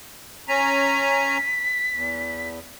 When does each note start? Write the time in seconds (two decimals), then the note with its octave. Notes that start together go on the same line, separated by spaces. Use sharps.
0.48 C#4 G#5 A#5 B6
1.94 E2